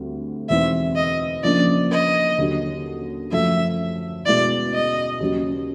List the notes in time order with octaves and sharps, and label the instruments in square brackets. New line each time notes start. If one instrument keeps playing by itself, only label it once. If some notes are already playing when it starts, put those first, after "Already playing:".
Already playing: [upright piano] D2 D3 G3 C4
[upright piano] E2 B2 G#3 C4 D#4 [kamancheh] E5
[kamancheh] D#5
[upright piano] C#3 F3 A#3 D4 [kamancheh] D5
[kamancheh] D#5
[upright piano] D#2 D3 F#3
[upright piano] F#2 C#3 F3 A3 [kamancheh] E5
[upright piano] B2 G#3 B3 E4 [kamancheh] D5
[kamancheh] D#5
[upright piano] D#2 C#3 F#3